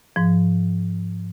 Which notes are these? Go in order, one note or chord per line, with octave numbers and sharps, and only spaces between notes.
G#2 F3